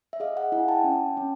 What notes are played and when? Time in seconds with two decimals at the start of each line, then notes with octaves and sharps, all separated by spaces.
0.13 E5
0.20 G#4 D#5 F5
0.37 E5 F#5
0.52 E4 F#5 G#5
0.68 G5 A5
0.84 C#4
1.17 C#4